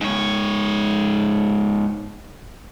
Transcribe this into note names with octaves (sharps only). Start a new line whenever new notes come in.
G#2 C#5